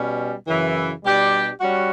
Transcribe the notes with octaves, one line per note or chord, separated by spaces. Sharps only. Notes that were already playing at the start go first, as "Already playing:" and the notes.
Already playing: B2 G3 C#4
F#2 C#3 E3
B2 G3 D4 G4 D5
G3 C#4 F#4